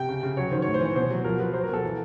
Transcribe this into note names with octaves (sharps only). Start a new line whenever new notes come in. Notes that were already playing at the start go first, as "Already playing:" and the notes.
Already playing: C3 G5
C#3
C#3
F#3 C#5
D#3 C5
A2 C#5
C5
E3 C#5
B2 C5
F#3
F3 A#4
F3 B4
F#3 C5
A#4
B2 A4
E3